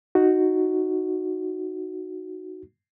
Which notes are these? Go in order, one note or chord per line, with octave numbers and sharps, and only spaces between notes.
D#4 F#4